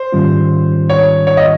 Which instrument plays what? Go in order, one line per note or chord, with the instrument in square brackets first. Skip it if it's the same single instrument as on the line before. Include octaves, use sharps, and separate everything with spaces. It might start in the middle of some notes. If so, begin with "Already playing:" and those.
Already playing: [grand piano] C5
[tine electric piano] G#2 D#3 G3 C#4 F4
[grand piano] C#5
C#5
D#5